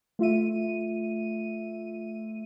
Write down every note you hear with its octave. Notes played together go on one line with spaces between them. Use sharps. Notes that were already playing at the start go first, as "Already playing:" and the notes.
A3 F4 E5 D#7